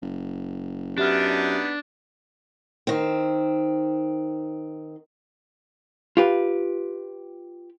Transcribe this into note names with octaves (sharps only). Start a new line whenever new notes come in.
F#1
F#2 B3 D4 D#4 G4 E5 F6
D#3 C4
F4 G4 B4